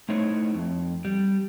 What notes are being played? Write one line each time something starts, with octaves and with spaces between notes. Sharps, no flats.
A3 D#4 E4 C5 C#5
F2
G3